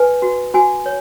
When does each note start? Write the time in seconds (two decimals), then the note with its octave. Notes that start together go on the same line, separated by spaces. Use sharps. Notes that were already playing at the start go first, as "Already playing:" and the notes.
Already playing: B4 G#5
0.22 F#4
0.54 F#4 G#5
0.86 C#5